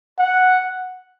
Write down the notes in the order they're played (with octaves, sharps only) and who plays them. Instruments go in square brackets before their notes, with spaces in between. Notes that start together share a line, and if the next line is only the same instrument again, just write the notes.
[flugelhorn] F#5